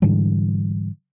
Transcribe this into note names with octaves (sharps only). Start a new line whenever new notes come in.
G#2 D3 E3 G3